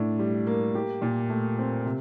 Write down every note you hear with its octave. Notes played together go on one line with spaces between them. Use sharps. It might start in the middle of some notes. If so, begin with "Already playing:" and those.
Already playing: A2 D4
G3
A#3
G4
A#2
A3
C4
C3